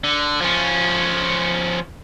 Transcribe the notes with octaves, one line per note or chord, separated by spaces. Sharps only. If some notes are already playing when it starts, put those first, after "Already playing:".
D3
F3 C#4